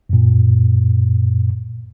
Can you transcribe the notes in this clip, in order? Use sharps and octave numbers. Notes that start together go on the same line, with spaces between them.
F#2 A#2